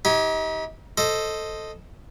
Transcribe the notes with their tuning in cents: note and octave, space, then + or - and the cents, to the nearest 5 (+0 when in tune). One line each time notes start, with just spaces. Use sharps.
D#4 +35 G4 +0 G#5 +0
A4 +0 C5 +0 D#5 +0